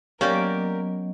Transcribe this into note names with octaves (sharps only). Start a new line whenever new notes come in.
F#3 A#3 B3 C#4 G4 A#4 D5 D#5